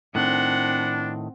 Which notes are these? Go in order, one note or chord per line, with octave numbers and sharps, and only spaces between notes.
A2 D#3 C4 D4 F#5